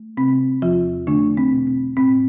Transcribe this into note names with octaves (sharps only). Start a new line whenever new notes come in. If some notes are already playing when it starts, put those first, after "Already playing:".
Already playing: A3
C3 C4
E2 F3 F4
D3 A3 D4
C4
B2
C4
A2 C4